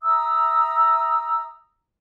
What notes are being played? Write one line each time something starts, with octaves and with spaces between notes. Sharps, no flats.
E5 A#5 D#6 E6